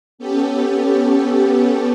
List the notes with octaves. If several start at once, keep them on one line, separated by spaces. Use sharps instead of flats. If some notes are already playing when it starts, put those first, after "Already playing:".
B3 C#4 G4 A4